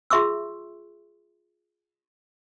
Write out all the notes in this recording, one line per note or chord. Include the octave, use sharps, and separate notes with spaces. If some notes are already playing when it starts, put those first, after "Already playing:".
F4 G#4 E5 C6 C#6 E6